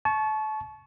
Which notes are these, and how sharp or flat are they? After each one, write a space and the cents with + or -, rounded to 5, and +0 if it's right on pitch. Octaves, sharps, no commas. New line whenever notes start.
A5 -30 C#6 +0